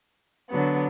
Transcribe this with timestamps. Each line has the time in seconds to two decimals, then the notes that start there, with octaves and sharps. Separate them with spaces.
0.50 D3 F#3 B3